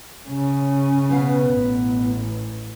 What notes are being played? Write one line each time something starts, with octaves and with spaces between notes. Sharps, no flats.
C#3 C#4
B2 B3 F5
A1